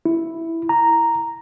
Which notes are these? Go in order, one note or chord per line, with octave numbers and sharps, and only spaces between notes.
E4
A#5